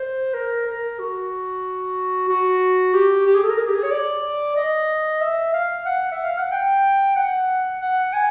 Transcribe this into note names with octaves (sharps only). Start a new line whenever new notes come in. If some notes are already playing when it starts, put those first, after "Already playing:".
Already playing: C5
A#4
A#4
F#4
F#4
G4
G4
G#4
A4
A#4
G#4
G4
G#4
C#5
D5
D#5
E5
F5
F#5
E5
F5
F#5
G5
F#5
F#5
G#5